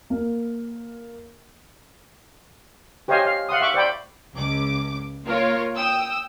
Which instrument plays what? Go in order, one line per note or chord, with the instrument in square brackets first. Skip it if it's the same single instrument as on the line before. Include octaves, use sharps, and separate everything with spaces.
[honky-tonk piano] A#3
[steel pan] G4 C5 C#5 D#5 F5 G#5
F5
F5 F#5 C6 D#6
E5 F#5 C#6 D6
C5 D5 G5 B5
[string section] C#2 D6
A#3 F4 A#4 C#5
G5 D#6 E6